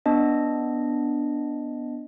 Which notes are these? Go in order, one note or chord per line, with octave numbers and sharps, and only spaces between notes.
B3 D4 D#5